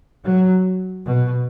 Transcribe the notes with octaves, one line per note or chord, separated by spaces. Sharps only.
F#3
B2